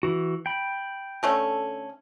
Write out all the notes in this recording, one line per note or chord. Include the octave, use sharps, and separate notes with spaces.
E3 F#4
G5 B5
D3 A3 C#4